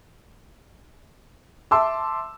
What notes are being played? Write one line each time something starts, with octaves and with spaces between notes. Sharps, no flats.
E5 A5 C6 D6 E6